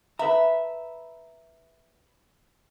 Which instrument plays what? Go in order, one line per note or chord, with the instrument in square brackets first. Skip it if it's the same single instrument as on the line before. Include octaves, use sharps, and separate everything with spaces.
[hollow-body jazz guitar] B4 A5 A#5 [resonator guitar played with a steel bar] E5